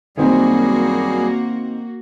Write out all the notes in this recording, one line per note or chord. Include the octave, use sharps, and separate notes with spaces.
F#2 D#3 G3 A#3 C4 F#4 G#4